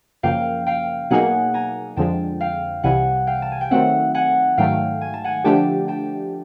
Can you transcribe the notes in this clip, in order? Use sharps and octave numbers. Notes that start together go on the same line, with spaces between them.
F#2 C#3 F3 A#3 F5 G5
F5 G5
B2 F#3 A#3 D#4 G#4 F#5 G#5
G#5 A#5
F2 D3 F3 G#3 G5 A5
F5 G5
C2 C3 E3 G3 F#5 G#5
F5 G5
A5
G#5
G5
D#3 F#3 A3 C4 E5 F#5
F#5 G#5
G#2 D#3 F#3 A3 F5 G5
G#5
A5
F#5 G#5
D3 F3 A3 D4 G4 G5 A5
G5 A5